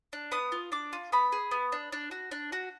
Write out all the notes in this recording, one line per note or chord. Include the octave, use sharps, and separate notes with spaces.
D4
B3 D#6
F4
D4 D6
F4
B3 B5
G#4
B3
D4
D4
F#4
D4
F#4